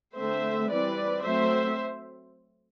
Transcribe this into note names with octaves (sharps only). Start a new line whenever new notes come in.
D3 A3 C4 C5 E5
E3 G3 C4 B4 D5
F#3 A3 C4 C5 E5